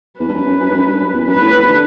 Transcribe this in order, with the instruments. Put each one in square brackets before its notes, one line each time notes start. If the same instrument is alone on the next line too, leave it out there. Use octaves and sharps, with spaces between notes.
[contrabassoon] E2 [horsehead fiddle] B4
[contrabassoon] G2
F#2
F#2
F#2
G2
F#2
G2
F#2
E2
[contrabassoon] F#2 [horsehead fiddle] B4
[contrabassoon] G2
A2
A2
C3
D3